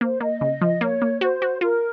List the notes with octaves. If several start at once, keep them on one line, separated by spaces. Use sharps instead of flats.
A#3 C5
A#3 D#5
C#3
F3
A#3 C#5
A#3
F#4 C5
F#4
F4 A#4